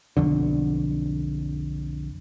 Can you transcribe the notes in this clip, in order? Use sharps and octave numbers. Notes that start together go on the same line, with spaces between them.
B1 F2 D3